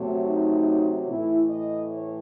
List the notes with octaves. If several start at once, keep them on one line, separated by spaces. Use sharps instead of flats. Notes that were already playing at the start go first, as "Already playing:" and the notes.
Already playing: C3 F#3 A3
D#4
A2 E3 A3 E4
D#5
C#5